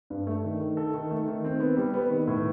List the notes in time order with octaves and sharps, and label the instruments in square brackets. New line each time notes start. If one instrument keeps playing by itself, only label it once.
[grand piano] G2
A3
D#3
D#3
A4
D#3
A3
D#3
C4
B3
G3
B3
D#3
A2